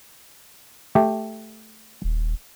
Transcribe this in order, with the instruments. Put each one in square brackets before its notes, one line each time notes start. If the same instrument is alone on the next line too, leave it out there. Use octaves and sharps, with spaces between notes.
[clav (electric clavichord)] A3 G4
[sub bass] D#1